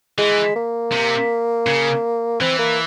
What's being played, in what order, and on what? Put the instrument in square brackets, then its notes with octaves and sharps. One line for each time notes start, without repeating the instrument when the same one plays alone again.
[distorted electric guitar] E3 [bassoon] G#3
[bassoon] A#3
[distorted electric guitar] C3
C#3
[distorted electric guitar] E3 [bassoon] C4
[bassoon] A#3